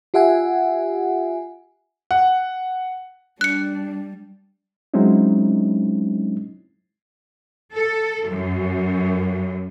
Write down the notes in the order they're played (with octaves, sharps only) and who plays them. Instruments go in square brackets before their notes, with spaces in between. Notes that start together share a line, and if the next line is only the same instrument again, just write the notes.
[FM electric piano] F4 G4 E5 F#5 G#5
[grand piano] F#5
[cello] G3 [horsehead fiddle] D4 [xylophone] F#6 C#7
[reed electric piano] F#3 G#3 C4 C#4 D#4 E4
[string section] A4
F#2